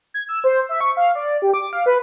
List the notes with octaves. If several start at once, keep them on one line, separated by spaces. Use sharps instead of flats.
G#6
E6
C5
E5
C#6
F5
D5
G4
D6
F5
B4